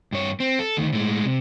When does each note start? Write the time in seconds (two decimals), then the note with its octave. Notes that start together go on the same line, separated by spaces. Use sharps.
0.13 G2 C#5
0.40 C4
0.59 A4
0.77 D2 D#3
0.93 A2 G#3
1.25 C3